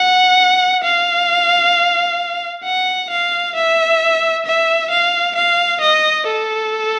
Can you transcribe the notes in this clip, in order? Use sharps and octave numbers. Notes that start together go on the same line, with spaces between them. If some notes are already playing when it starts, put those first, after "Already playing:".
Already playing: F#5
F5
F#5
F5
E5
E5
F5
F5
D#5
A4